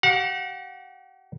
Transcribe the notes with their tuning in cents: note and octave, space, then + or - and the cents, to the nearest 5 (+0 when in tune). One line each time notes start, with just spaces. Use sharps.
G4 -45 F#5 -35